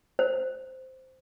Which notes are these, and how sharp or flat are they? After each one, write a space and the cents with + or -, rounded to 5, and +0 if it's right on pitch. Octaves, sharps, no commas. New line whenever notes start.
C5 -5